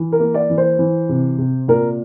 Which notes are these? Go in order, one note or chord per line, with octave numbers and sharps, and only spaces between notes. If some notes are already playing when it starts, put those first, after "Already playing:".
Already playing: E3
A#4
A#3
D5
E3
C5
E3
C3
C3
A#2 A#4